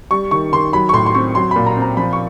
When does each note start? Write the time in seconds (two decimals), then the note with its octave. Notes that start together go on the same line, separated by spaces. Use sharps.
0.11 G3 C#6
0.31 D#3 C#6
0.53 D#3 C6
0.73 F#3 B5
0.89 C#6
0.93 A2 C6
1.06 C6
1.15 C4 C#6
1.35 F#3 C6
1.51 A#2 B5
1.66 A#5
1.77 C4
1.82 A#5
1.97 F3 B5
2.13 C#6